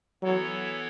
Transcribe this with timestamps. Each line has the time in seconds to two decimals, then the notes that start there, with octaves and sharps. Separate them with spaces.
0.23 E3 F#3 B3 E4 A4 C#5